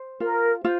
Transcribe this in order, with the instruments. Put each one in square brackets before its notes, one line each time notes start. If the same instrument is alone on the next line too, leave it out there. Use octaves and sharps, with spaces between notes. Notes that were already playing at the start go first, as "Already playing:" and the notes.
Already playing: [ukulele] C5
[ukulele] F4 [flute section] A#4
[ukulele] F4 [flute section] C5